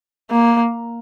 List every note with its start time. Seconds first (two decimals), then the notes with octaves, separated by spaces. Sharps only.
0.31 A#3